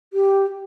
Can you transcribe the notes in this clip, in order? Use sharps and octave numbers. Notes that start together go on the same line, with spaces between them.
G4